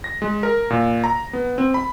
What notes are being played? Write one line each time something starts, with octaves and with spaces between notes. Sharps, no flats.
A#6
G#3
A#4
A#2
A#5
B3
C4
B5